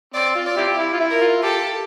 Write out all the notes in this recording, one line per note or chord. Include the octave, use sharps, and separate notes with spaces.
C4 D5
F4
D5
C4 E4 G4
E4
F4
E4
A#4
F4
G4 A4